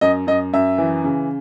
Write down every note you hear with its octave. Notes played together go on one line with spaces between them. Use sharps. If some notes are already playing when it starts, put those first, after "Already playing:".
F#2 D#5
F#2 D#5
F#2 E5
E3
C#3